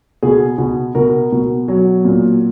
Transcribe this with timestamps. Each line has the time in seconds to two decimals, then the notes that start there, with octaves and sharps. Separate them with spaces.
0.23 B2 G#4
0.58 B2
0.95 B2 A#4
1.32 B2
1.68 F#3
2.05 A#2